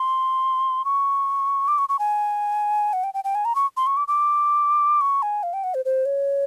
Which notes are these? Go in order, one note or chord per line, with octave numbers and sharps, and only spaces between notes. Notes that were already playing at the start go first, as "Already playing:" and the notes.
Already playing: C6
C#6
D6
C#6
C#6
G#5
F#5
G5
G5
G5
G#5
A#5
C#6
C6
C#6
D6
D6
C#6
G#5
F5
G5
F#5
C5
C5
C#5